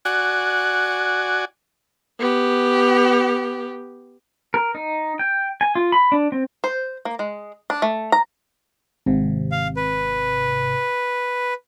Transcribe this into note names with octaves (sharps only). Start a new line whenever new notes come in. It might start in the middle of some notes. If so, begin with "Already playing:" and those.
F#4 D5 G#5 F#6
B3 G4
A#4
D#4
G5
G#5
F4
B5
D4
C4
C5
A#3
G#3
D4
A3
A#5
G#1 C3
F5
B4